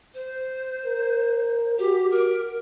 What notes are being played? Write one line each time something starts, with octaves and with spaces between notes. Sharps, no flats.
C5
A#4
F#4 G4
A#4